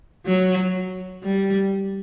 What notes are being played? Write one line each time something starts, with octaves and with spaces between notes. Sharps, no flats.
F#3
G3